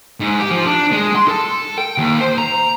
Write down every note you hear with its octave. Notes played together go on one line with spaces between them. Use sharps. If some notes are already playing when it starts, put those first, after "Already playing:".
G#2
G4
F3
D4
G#3
C6
A4
G5
D#2
C5
A#5